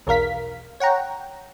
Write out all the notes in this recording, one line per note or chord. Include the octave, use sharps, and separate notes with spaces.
B1 E2 A#4 F5 B6
C#5 F#5 G5 A#5